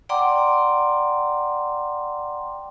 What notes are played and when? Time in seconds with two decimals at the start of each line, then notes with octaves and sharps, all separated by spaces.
0.09 D5 F#5 G5 A#5 C6 D6